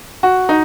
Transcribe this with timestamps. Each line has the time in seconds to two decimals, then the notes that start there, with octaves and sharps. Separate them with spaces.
0.23 F#4
0.49 D#4